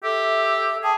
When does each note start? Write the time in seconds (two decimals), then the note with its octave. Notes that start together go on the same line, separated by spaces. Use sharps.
0.03 G4 A4 E5 E6
0.83 G#4 G5 A5 D#6